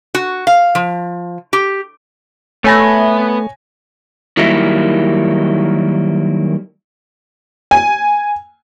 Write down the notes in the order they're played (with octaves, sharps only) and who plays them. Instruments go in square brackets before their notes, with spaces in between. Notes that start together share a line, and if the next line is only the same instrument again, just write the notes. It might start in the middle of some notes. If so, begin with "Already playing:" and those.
[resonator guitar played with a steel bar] F#4
F5
F3
G4
[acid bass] A3 [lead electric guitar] B3 B5 [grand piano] C#5 G#5 A#6
[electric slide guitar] D#3 F#3 G3 A#3 D#4 E4
[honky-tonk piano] G#5